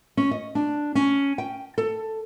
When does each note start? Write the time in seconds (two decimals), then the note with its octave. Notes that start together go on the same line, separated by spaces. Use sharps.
0.17 C#4
0.31 D#5
0.55 D4
0.95 C#4
1.38 G5
1.78 A4